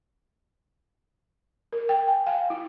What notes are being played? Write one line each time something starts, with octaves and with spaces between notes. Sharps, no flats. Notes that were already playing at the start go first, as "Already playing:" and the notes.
A#4
G5
G#5
F5
E4